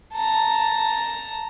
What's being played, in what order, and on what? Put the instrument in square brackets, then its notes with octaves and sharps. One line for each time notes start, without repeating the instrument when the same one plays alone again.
[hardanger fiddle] A5 A#5